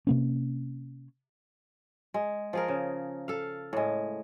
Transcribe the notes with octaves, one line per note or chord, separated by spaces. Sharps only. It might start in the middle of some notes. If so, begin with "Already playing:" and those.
C3 A#3 C#4
G#3
F3 G#4 A#4
C#3
A4 F5
A2 G#3